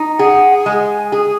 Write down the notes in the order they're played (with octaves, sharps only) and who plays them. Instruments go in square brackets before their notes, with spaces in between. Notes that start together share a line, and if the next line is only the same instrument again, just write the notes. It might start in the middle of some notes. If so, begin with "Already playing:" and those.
Already playing: [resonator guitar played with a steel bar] D#4
[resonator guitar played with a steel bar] G#4 [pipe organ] F#5
[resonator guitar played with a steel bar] G#3 [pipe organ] G#5
[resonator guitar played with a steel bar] G#4